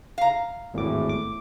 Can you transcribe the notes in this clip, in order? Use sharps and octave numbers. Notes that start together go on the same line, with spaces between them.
F5 A#5
G#1 E2 A2 D6
D6